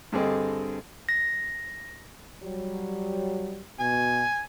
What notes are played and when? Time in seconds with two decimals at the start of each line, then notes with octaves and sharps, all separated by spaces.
0.12 G2 D3 C4 G#4 A4 D#5
1.09 A#6
2.41 F#3 G3
3.80 B2 G#5